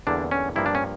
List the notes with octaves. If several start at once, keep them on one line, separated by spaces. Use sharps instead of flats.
E2 D3 G3 A#3 D4
C#4
G2 F3 A#3 E4
D4
C#4